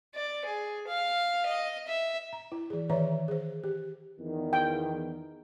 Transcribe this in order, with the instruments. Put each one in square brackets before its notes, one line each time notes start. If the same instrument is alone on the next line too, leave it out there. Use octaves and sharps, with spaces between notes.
[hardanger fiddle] D5
G#4
F5
D#5
E5
[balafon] A#5
E4
E3 G#4
D#3 E3 B4 C#5 E5 A#5
G#4 C5
G4
[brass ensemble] E2 D#3
[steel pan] G5